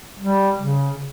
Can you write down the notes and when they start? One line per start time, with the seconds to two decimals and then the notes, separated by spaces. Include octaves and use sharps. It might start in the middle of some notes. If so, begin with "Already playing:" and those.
0.19 G3
0.59 C#3